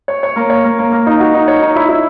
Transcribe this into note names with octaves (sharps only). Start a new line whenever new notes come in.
C#5
C#5
A#3
C#5
A#3
A#3
A#3
D#4
F#4
D#4
C#5
D#4
E4
E4